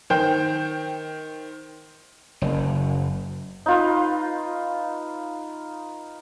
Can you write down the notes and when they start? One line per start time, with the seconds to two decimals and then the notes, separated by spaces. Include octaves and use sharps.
0.10 D#3 C5 G5 G6
2.42 F#1
3.66 D#4 F4 B4